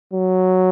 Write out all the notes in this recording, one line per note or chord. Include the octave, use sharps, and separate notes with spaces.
F#3